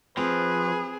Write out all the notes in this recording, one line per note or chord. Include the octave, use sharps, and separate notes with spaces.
F3 C4 G#4 B4